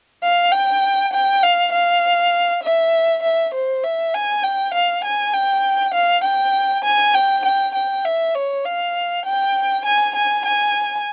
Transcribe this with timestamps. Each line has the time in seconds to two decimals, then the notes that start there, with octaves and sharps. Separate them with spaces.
0.23 F5
0.52 G5
1.13 G5
1.43 F5
1.72 F5
2.63 E5
3.23 E5
3.54 C5
3.84 E5
4.14 G#5
4.44 G5
4.74 F5
5.05 G#5
5.34 G5
5.94 F5
6.24 G5
6.85 G#5
7.15 G5
7.45 G5
7.75 G5
8.05 E5
8.35 C#5
8.65 F5
9.26 G5
9.85 G#5
10.15 G#5
10.46 G#5